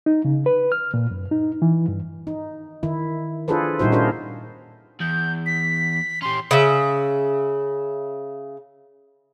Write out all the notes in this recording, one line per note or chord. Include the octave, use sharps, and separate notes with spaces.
D#4
C#3
B4
F6
A#2
F#2
D#4
E3
G2
D#4
D#3 E4
D4 F4 G#4 A4 B4 C5
A#2 G3 D#4 E4 F#4 C5
C#4 D4 F4 G#4 A#4 C5
E2 G6
B6
C#4 G4 C6
C#3 E5